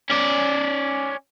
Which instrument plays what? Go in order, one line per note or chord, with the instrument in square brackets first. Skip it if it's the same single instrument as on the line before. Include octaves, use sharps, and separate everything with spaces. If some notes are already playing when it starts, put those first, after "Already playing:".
[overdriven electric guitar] C#4 D5